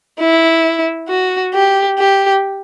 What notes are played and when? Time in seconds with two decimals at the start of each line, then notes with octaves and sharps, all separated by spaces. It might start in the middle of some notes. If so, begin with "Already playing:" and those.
0.19 E4
1.09 F#4
1.54 G4
1.99 G4